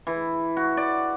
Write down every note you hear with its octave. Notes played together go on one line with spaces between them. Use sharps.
E3
F#4
D5